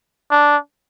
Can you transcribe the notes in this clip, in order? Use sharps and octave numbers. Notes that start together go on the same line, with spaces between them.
D4